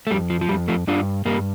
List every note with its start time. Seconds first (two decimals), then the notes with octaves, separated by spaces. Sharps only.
0.07 A3
0.11 F2 G3
0.30 F3
0.41 F3
0.49 F2 G3
0.68 F3 A3
0.87 G2 D4 F4
1.25 G2 G3 A#3